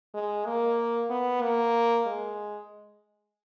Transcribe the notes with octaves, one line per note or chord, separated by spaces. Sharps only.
G#3
A#3
B3
A#3
G#3